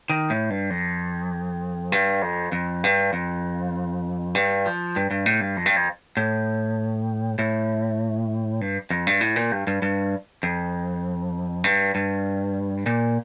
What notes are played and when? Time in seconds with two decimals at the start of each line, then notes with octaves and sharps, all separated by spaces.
0.10 D#3
0.30 A2
0.50 G2
0.70 F2
1.92 G2
2.22 F2
2.52 F2
2.84 G2
3.13 F2
4.35 G2
4.66 F3
4.96 G2
5.11 G2
5.26 A2
5.41 G2
5.57 F2
5.66 G2
5.76 F2
6.17 A2
7.39 A2
8.61 G2
8.90 F2
9.07 G2
9.21 A2
9.36 A#2
9.52 G2
9.67 G2
9.82 G2
10.43 F2
11.64 G2
11.95 G2
12.86 A#2